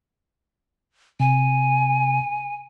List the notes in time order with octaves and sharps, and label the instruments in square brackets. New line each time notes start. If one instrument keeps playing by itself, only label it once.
[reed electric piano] C3 [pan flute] G#5